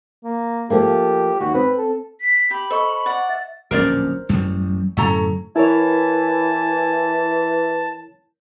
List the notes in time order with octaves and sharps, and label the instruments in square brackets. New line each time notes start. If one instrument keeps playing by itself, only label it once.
[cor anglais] A#3
[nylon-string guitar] F3 A3 A#3 [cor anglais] G4
[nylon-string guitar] D#2 [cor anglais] F#4
[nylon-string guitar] C4 [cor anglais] B4
[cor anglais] A4
[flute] B6
[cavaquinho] G4 [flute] B5
[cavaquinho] A4 [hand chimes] C5 D#5 C#6
[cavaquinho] D5 F#5
[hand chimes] E5 [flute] A6
[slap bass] D1 A#1 C#4 [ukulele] A#4 C5 D5
[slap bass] A1 F#2 G3
[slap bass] F#2 A2 D3 [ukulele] C#4 A4 A#5
[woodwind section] E3 [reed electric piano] E4 A#4 C#5 [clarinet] G#5 [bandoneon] A5